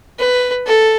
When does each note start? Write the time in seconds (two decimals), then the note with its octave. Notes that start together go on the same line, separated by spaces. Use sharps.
0.19 B4
0.67 A4